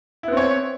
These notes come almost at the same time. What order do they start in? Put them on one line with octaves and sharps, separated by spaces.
E4 B3 C4 C#5